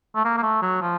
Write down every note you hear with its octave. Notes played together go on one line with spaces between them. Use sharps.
A3
A#3
A#3
A3
F#3
F3